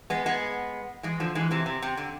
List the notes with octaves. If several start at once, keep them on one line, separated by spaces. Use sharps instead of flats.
G#3 B3
G#3 B3
E3 G#3
D3 F3
E3 G#3
C3 E3
C3
C3
D3